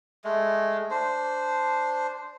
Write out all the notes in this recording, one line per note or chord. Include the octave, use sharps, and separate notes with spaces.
G#3 A3
D4 C5